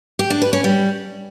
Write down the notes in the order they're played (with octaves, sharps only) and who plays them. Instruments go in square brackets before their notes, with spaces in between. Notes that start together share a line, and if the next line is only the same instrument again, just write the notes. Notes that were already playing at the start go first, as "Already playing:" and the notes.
[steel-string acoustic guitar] G4
D4
B4
C#4
G3